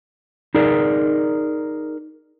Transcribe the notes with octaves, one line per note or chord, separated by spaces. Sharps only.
D#4 G#4 A#4 D5